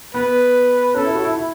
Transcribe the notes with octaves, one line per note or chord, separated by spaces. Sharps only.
B3 B4
C#4 A4
E4
F#4
E4
E4